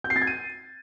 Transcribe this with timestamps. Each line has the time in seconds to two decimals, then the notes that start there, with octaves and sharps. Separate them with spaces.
0.04 G6
0.10 C7
0.16 A6
0.22 G#6
0.27 D#7